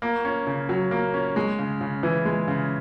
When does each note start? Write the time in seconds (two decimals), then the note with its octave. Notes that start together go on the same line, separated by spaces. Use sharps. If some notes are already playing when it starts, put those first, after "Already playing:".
0.02 A#3
0.25 C#4
0.47 C#3
0.69 F#3
0.91 A#3
1.14 C#4
1.36 G#3
1.59 C#3
1.81 C#3
2.03 E3
2.25 G#3
2.48 C#3